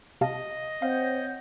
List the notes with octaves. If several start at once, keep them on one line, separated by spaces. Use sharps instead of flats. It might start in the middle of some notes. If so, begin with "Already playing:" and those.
C3 D#5 F5 A5
C4 C#5 F5 F#5 G6